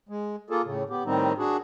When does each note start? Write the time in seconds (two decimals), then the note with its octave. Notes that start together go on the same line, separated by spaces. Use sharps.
0.09 G#3
0.50 A#3 F4 G#4 A4
0.65 A2 C#3
0.90 B3 G4
1.05 A2 D#3 G3 C4 D#4
1.38 D4 F#4 G#4